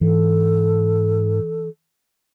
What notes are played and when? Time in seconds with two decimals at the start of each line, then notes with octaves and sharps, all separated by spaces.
0.01 G#2 E3 A4